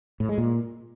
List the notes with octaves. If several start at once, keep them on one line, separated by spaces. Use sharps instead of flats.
A2
G#3
A#2